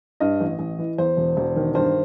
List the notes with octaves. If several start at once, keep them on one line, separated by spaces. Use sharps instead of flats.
G2 D#5
A1
A1
E3
E2 C5
E1
E1
D#3
G2 C5